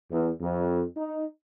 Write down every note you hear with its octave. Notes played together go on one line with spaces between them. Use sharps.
E2
F2
D#4